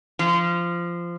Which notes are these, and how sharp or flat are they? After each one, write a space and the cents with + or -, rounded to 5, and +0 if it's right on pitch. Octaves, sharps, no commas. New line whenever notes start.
F3 -20